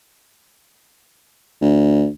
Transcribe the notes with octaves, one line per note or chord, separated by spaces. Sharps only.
D2